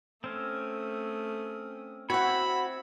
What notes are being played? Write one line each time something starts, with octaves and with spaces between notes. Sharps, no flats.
A3 C4 C#4 D#6
C4 E4 F#4 C#5 F#5 B5